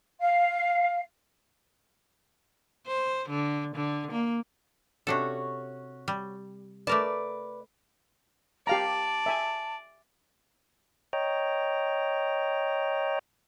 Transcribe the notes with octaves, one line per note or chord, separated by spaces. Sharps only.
F5
C5
D3
D3
A#3
C3 C#4 D4 F#4 A4 C#5
G3
A3 A#4 B4 D5 A5
G4 D5 F5 A5 A#5
E5 G#5
C#5 D#5 G5 A#5